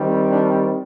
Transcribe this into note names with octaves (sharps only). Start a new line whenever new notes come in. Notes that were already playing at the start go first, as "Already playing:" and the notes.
Already playing: D#3 G3 C4
D4